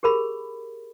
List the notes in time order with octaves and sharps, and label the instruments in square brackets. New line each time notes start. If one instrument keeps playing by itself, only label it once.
[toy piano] G4 G#4 A#4 B5